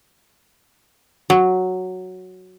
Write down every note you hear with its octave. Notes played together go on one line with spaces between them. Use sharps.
F#3